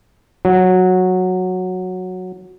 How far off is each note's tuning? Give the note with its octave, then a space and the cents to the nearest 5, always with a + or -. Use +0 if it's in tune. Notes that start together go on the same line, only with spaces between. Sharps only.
F#3 -10